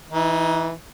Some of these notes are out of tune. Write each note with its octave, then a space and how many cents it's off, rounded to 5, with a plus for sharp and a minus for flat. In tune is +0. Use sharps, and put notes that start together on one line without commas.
E3 -5 D#4 +25